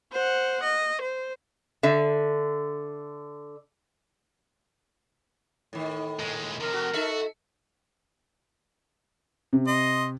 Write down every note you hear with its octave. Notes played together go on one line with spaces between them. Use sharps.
C5 F#5
D#5
C5
D3 E5
A2 D#3
A#2 G#3
C3 F3 A#4
F#4
D#4 F#4 A4 E5
C3
D#5 C6